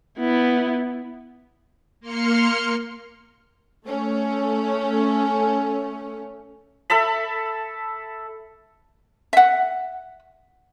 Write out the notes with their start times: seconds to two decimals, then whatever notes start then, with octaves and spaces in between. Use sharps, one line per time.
0.19 B3 E4
2.00 A#3 C6 F6 C#7
3.85 A3 C#4
6.90 A4 E5 A5 B5
9.33 E5 F#5